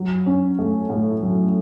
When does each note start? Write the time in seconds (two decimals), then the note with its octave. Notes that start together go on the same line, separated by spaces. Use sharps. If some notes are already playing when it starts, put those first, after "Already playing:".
Already playing: F#3
0.26 C#4
0.59 A3
0.89 A2
1.22 F#3